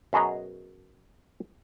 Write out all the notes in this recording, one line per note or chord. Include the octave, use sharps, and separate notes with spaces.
F#2 B2 F#4 G#4 D#5 A#5